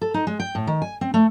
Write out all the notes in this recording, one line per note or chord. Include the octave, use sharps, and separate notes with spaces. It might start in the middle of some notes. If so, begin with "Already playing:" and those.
A4
D#4
G#3
G5
A2
D#3
G#5
C4
A3